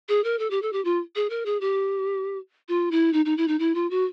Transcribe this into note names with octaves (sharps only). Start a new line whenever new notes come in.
G#4
A#4
A4
G4
A4
G4
F4
G#4
A#4
G#4
G4
F4
E4
D#4
D#4
E4
D#4
E4
F4
F#4